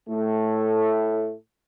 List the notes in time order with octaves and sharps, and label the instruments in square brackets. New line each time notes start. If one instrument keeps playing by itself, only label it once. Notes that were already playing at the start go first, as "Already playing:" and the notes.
[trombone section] A2 A3